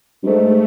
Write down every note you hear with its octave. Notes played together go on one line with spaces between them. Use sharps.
G2
G#2 A3